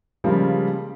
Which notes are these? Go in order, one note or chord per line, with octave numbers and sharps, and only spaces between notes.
C#3 F3 G3 G#3 A#3